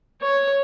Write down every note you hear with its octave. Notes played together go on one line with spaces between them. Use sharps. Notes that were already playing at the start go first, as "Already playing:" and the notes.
C#5